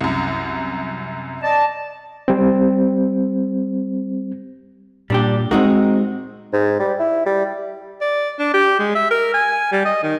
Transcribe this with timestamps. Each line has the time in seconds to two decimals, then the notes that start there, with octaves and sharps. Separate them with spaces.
0.01 C2 F#2
1.43 D5 D#5 A5
2.28 G3 C4
5.10 A#2 G3 D4 G4
5.51 G#3 C4 D#4 F#4 A#4
6.53 G#2
6.80 G3
6.99 E4
7.26 G3
8.01 D5
8.39 D4
8.54 G4
8.79 G#3
8.95 E5
9.11 A#4
9.34 G#5
9.72 G3
9.85 D#5
10.03 D#3